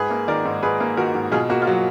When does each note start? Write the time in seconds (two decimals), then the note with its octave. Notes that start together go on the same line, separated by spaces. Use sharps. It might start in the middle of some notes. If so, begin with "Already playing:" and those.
Already playing: G#2 G#4 B4
0.10 A#3
0.28 D#3 A#4 D5
0.45 G#2
0.63 G#2 G#4 B4
0.80 A#3
0.97 D#3 F#4 A#4
1.15 G#2
1.32 B2 F4 G#4
1.50 A#3 F#4
1.62 F4
1.67 F#3 F#4